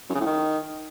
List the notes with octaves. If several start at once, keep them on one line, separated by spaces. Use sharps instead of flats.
F#2
C#3
A2
D#3